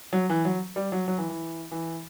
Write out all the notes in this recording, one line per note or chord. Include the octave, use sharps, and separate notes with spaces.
F#3
E3
F#3
G3
F#3
F#3
E3
E3
E3